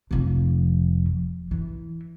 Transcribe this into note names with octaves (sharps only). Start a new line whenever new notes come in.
F1 F3
E3